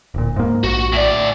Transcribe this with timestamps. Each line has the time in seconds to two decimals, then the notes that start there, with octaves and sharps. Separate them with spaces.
0.14 D1 A#2
0.36 G#2 A#3
0.64 A#1 F#4
0.92 A2 D5